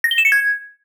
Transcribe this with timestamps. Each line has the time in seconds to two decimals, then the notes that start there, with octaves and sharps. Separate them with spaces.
0.04 A#6
0.11 G7
0.18 E7
0.25 C#7
0.32 G#6